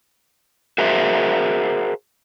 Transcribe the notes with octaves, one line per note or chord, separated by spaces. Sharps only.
F#4 G#4 A#4 C5 E5 F#5